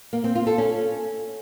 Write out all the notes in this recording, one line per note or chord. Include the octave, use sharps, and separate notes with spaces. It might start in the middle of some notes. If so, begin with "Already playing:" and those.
A#3
C4
F4
A4
C#4